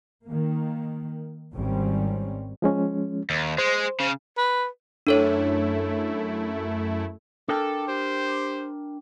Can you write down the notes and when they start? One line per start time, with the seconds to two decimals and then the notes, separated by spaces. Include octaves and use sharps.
0.25 D#3 A#3
1.54 G#1 D#3 G3 C4 C#4
2.62 F3 G#3 C#4
3.30 D#2
3.58 G#3 C5
4.00 C#3
4.38 B4
5.07 F#2 A3 D4 E4 A4 C#5
7.49 D4 A4 A#4 G5
7.87 G4 C5